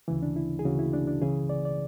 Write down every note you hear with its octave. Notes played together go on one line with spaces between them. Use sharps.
D2 C#3 E3
D4
E4
G#4
D2 C#3 E3 F#4
E4
D4
D4
C#2 C#3 E3 G#4
D5
D5